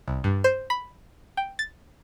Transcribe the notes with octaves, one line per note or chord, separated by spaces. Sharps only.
C2
G2
C5
B5
G5
A6